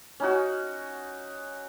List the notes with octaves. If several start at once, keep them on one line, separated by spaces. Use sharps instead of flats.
C#4 D#4 F#4